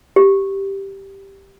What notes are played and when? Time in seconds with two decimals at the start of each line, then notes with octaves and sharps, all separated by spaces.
0.16 G4